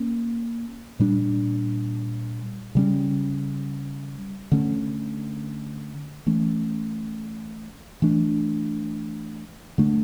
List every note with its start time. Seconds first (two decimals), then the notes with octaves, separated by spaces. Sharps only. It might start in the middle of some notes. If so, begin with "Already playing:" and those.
Already playing: A#3 C#4
0.99 A#2 G3 D4
2.75 C#3 G3 C#4
4.52 D3 A3 C#4
6.27 E3 A3 C#4
8.02 E3 A3 D4
9.78 D3 A3 D4